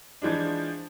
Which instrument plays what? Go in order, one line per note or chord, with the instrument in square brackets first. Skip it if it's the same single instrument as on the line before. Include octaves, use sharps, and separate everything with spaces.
[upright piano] E3 F3 G#3 D4